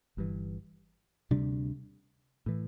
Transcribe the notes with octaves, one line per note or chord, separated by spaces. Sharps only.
G1 G2 E3
D2 C3 G3 D4
A2 E3